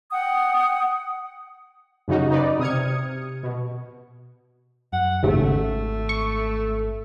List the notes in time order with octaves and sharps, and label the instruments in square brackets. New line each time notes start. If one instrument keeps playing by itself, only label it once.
[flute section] F#5 G5 D#6
[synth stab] F#2 C#3 D#4 F#4
D#4 B4 D5
C3 D#6 F6 G#6 C#7
B2
[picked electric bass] F#2 [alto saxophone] F#5
[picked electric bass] G#1 [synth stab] D#2 G#2 C#3 [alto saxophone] A3
[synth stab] C#6